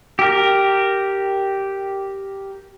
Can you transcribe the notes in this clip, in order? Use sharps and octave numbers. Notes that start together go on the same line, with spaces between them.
G4 A#4